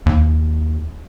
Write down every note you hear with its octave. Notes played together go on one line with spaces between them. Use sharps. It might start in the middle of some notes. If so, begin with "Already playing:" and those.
D#2